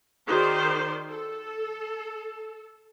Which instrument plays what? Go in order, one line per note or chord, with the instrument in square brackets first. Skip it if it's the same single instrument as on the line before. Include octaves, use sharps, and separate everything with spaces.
[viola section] D#3 C5 D5 [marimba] D#4 F#4 G#4
[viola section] A4